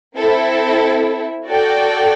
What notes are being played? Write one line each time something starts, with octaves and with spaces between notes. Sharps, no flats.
C4 E4 A4
F#4 A4 D5 G5